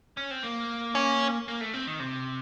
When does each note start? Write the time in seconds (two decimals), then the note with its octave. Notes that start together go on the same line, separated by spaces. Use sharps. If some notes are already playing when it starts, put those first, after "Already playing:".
0.17 C#4
0.31 C4
0.43 A#3
0.95 C#4
1.48 A#3
1.61 A3
1.74 C4
1.87 D#3
2.00 C3